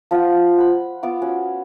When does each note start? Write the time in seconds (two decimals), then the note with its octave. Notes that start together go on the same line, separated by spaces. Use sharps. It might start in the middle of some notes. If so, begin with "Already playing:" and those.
0.11 F3 F4 C5 F#5
0.58 F#5 B5
1.03 B3 F4 D6
1.22 C#4 F#4